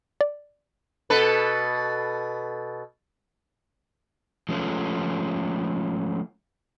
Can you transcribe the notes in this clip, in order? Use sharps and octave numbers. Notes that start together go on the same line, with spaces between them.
D5
B2 A4 B4
F3 G#3 A3 C#4